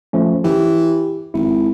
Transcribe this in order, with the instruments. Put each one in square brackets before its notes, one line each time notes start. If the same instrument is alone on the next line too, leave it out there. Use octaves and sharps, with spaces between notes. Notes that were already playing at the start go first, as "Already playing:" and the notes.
[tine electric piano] F3 A3 C#4
[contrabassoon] E3 [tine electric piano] G4
[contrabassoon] G#1 [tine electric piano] E4